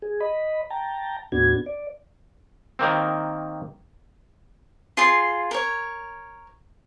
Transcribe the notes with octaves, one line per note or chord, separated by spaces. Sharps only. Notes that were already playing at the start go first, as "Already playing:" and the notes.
G#4
D#5 B5
G5 A5 A#5
D#2 A2 B3 D4 F#4 G#6
D5
D#3 A#3 C4
F4 G#4 C6
A#4 C#5